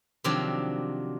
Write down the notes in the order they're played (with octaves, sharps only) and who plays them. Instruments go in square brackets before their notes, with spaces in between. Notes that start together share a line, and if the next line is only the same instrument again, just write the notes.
[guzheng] C3 D#3 F3 F#3 C4 D4